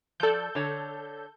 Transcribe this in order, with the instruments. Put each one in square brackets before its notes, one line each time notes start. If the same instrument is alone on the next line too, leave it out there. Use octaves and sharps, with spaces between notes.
[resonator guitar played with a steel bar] F3 D5 [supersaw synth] A4 G6
[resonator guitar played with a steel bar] D3 C#5 A5